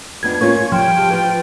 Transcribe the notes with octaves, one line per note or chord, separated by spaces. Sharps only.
F2 B3 D4 G#6
A#3 C#4 F4 C#6 G#6
F3 G3 G5
G4 A5
F4 B4